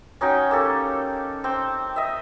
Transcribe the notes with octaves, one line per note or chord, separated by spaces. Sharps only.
C#4 D#4 F#4 G5
A#3 G4 A4
C4 G5
D#5 E5